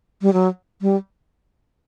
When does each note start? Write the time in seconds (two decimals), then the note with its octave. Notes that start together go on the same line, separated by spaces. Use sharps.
0.22 G3
0.33 F#3
0.82 G3